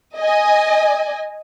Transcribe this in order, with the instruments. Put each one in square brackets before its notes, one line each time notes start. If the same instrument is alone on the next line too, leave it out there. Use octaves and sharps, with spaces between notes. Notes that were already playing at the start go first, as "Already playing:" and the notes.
[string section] D#5 G#5